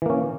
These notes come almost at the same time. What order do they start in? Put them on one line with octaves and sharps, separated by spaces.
E3 A#3 C#4